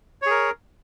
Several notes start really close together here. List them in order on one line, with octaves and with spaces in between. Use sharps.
C#5 G#4 A#4